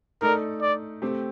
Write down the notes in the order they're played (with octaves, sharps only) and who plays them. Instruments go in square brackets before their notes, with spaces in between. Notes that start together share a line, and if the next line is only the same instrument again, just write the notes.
[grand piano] A3 D#4 A4 D5 [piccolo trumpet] A#4
[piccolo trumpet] D5
[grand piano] A3 C4 G4